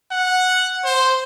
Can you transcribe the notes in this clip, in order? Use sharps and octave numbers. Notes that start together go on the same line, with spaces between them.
F#5
C5